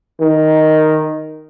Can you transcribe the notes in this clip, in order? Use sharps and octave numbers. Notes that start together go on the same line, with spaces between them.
D#3